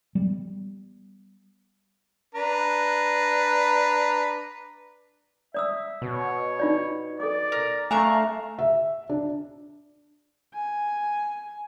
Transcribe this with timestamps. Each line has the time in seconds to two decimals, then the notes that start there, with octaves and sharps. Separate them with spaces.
0.15 G3 G#3 B3
2.35 D4 B4 A#5
5.54 D5 E5 D#6 E6
6.02 B2 C#5
6.59 D#4 F4 D5
7.20 A4 D5 D6
7.52 A#4
7.91 A3 D4 F5 G#5 A#5 C#6
8.59 E5
9.09 D4
10.54 G#5